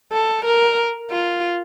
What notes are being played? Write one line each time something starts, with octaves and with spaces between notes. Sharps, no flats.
A4
A#4
F4